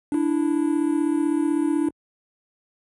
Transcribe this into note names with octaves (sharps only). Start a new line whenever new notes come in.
D4 E4